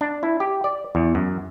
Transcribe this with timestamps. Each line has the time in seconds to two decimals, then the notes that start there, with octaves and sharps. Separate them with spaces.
0.01 D4
0.23 E4
0.40 G4
0.64 D5
0.95 E2
1.15 F#2